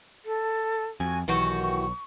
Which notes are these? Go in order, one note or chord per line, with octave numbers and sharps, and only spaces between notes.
A4
F2 F#4 G#5
B1 D#3 E3 F#4 G4 C#6